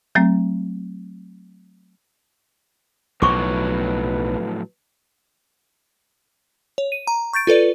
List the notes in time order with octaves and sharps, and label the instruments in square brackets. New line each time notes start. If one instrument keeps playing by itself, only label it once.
[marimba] F#3 A3 C4
[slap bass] B1 [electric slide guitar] A2 F3 F#3 [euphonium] B4 [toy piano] C#6 D6
[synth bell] C#5
D#7
A#5
C#6 G6 A6 D7
F4 A4 B4 D5